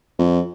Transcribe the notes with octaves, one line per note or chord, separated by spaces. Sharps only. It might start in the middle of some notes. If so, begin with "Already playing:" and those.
F2